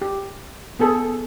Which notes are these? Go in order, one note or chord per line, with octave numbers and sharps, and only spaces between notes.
G4
B3 G#4 A4